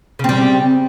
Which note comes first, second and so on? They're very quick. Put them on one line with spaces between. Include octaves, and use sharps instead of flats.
C#3 C4 G3